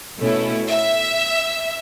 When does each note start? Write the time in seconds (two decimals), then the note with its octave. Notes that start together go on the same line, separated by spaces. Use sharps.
0.19 B2 A3 C#4 E4
0.68 E5